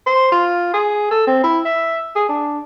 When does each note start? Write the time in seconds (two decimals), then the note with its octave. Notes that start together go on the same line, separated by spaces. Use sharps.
0.06 C5
0.32 F4
0.73 G#4
1.11 A4
1.27 C4
1.43 E4
1.65 E5
2.16 G#4
2.29 D4